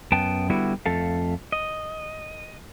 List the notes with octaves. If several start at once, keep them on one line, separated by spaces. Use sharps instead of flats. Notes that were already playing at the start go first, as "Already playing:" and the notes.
F#2 B3 G5 A5
D3 G3 B3 E4 F#4
F2 A3 A4 F5
D#5